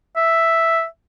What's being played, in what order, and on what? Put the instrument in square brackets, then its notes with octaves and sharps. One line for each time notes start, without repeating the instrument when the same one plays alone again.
[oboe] E5